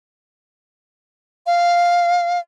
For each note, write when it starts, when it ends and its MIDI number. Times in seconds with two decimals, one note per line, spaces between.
1.46 2.39 77